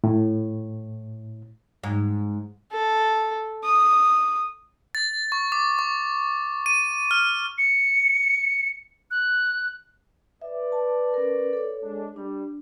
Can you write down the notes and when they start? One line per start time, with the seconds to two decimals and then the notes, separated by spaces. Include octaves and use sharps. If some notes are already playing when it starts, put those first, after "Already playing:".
0.04 A2
1.83 G#2
2.72 A4
3.64 D#6
4.95 A6
5.32 C#6
5.52 D6
5.79 C#6
6.66 D#7
7.11 F6
7.58 C#7
9.11 F#6
10.42 B4 D5 E5
10.72 A5
11.14 C#4 A#4
11.53 A4 C#5
11.83 G#3 D4
12.16 G3 D4